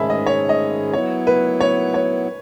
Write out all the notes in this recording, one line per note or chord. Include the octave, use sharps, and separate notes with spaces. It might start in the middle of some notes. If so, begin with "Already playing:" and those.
Already playing: G#2 D#3 G#3 C#4 G#4 E5 A5 B5
D#5
C#5
D#5
F#3 B3 E4 C#5
B4
C#5
C#5